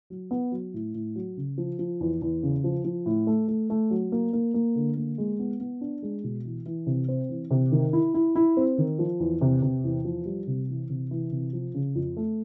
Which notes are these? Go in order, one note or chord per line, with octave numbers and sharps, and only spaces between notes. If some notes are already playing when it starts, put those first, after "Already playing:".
F#3
B3
F#3
A2
A2
F#3
C#3
F3
F3
E2
E2
C#3
F3
F3
A2
A3
A3
A3
F#3
A#3
A#3
A#3
D3
A#3
G#3
B3
B3
D4
G#3
B2
E3
E3
C3
C4
E3
C3
D#3
E4
E4
E4
C4
D#3
F3
E2
C3
C3
E2
F3
G3
C3
E3
C3
E3
C3
F3
C#3
F2
A3